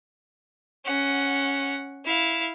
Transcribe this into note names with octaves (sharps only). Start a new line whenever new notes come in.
C#4 F#5
E4 F5